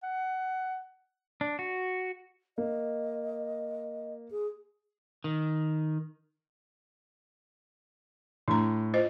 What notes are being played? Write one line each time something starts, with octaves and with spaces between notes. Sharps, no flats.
F#5
D4
F#4
A#3 D#5
G#4
D#3
A2 D4 A#5
F4 C5 D#5